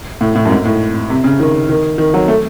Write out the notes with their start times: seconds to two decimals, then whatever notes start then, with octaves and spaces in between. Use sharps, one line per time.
0.21 A2
0.35 A2
0.45 F#2
0.51 G#2
0.65 A2
1.10 C3
1.24 C#3
1.40 D#3
1.69 D#3
1.98 D#3
2.14 F#3
2.28 A3